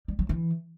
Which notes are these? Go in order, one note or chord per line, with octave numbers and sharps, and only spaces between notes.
G3
F#3
E3